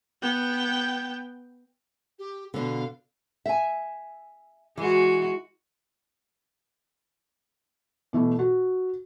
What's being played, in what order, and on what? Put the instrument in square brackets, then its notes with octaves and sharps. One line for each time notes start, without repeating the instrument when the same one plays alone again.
[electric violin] B3 G5
[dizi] G4
[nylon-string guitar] B2 D3 [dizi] F5
[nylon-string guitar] E5 G#5
[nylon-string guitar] E3 [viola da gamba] G#3 F#4
[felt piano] B2 E3 A3
F#4